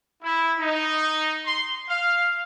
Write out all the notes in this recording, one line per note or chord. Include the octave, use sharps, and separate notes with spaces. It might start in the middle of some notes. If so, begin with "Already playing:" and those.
E4
D#4
C6
F5